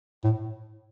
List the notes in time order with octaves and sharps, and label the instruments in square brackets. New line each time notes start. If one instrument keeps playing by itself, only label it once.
[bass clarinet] A2